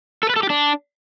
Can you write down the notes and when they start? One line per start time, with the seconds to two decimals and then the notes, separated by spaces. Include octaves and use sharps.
0.23 A4
0.30 B4
0.36 A4
0.43 G4
0.50 D4